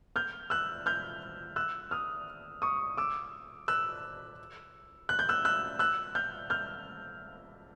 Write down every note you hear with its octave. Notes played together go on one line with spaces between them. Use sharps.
F6 G6
E6 F#6
F6 G6
E6 F#6
D#6 F6
C#6 D#6
D6 E6
E6 F#6
F#6
G6
E6 F#6
E6 F#6
E6 F#6
F6 G6
F6 G6